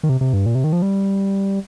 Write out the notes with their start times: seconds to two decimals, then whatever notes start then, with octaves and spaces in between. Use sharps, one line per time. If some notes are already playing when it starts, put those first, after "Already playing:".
0.03 D#3
0.09 C3
0.21 C3
0.33 G2
0.46 A#2
0.55 C3
0.64 D#3
0.73 F3
0.82 G3